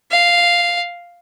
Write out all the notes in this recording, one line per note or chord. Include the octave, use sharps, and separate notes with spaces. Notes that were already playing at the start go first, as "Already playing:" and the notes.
F5